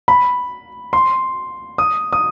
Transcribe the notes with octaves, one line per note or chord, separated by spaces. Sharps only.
B5
C6
D#6
D#6